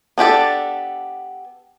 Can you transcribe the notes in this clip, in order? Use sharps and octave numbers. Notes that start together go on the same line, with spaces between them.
B3 D4 G4 A4